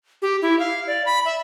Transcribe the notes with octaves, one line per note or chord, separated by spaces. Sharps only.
G4
E4
F5
D5
B5
E5